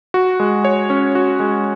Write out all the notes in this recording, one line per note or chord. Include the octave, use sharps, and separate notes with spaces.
F#4
G#3
C#5
C#4
F#4
G#3